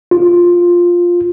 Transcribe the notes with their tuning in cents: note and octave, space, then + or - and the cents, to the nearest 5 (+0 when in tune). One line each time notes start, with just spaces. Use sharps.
F4 +5